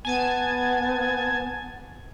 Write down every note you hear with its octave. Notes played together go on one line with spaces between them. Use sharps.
B3 G#5 A5 G#6